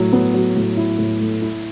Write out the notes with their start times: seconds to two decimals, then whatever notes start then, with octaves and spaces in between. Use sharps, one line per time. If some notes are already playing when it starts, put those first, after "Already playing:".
Already playing: A2 F#3
0.13 B3
0.34 F#3
0.56 A2
0.77 E4
0.99 A2
1.21 A3
1.42 E4